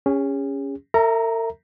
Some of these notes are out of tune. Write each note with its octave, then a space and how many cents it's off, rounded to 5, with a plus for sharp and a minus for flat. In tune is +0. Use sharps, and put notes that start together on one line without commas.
C#4 +5 G#4 -40
A#4 -45 E5 +0 A#5 +0